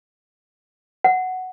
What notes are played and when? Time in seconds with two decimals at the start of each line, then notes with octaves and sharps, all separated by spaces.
1.04 F#5